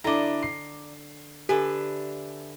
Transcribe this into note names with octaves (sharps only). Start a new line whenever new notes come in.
D3 D4 E4 D5 D#5 A#5
C7
D3 D4 G4 B4 E5 G#5